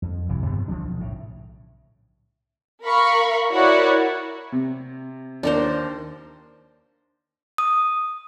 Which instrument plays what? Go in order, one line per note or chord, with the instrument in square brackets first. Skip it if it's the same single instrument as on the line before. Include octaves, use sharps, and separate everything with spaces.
[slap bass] F2
C2 F#2 C3 E3
G2 C3 B3
E3 F3 G3 D4
B1
A2 C#3
[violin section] A#4 F5 B5 C#6
E4 F#4 A#4 C#5 D5 F#5
[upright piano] C3
[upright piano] D#2 [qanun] D4 A#4 C5
[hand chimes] D#6